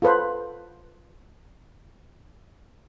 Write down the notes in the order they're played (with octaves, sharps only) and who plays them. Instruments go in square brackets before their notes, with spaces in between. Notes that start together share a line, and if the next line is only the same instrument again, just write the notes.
[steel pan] F4 A4 B4 C5